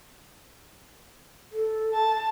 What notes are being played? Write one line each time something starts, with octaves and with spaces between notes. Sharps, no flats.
A4
A5